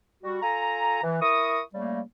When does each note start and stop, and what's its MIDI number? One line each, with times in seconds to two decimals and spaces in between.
0.23 0.41 55
0.23 0.41 66
0.42 1.02 65
0.42 1.02 69
0.42 1.02 80
0.42 1.02 82
1.03 1.17 52
1.21 1.61 64
1.21 1.61 70
1.21 1.61 85
1.21 1.61 87
1.74 2.01 49
1.74 2.01 55
1.74 2.01 57
1.74 2.01 58